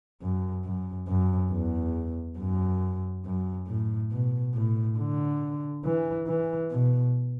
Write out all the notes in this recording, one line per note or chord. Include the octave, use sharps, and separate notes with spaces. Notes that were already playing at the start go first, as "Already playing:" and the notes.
F#2
F#2
F#2
E2
F#2
F#2
A2
B2
A2
D3
E3
E3
B2